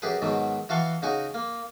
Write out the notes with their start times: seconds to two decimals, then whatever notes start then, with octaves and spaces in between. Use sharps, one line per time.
0.02 F#2 G4 G#4 B4
0.22 G#2 B2 D#3 F#3
0.69 E3 F#4 F5 A5 C6 C#6
1.02 C#3 D#4 F#4 G#5
1.34 A#3